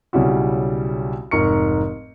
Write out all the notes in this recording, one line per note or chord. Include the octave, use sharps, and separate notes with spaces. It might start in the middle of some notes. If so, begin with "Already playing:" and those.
B1 C#3 G3 E4 F#4
F1 G#2 A#4 C#6 C#7